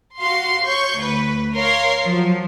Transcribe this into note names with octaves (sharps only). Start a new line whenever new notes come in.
F#4 F5 C6
C#5 C#6 G6
D2 B4
A#4 C#5 F5 C6
F3 F#3